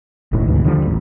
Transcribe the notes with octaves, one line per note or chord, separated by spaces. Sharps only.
E1 A1 A2 D#3
D2 G#2 B2 E3
D#2 D3 F3 G3
D#1 A1